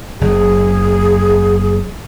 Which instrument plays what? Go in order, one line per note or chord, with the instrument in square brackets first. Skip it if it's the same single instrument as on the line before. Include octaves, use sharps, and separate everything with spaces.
[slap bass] F#1 [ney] G#4